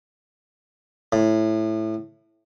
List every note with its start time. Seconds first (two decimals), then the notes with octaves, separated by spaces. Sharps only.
1.12 A2